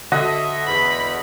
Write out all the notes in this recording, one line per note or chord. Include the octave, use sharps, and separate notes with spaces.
D3 F#4 A4 D#5 E5 F#6
E2 B5